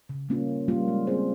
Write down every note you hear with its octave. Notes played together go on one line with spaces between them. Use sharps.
C#3
G3 A#3 C#4 F4
C#3
G3 A#3 C#4 F4
G#3
C4 F4 G#4 C5